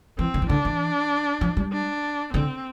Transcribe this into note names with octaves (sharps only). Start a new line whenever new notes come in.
E3 C4
D3
E3
D3 D4
E3
F3
G3
D4
D3 C4